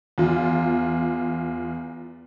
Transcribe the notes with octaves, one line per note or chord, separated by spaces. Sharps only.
E2 F4